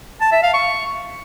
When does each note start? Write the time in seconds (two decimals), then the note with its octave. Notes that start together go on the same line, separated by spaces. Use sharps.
0.21 A5
0.32 E5
0.43 F5
0.54 C#6